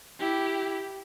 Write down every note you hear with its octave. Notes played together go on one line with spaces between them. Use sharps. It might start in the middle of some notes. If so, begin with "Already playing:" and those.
E4 G4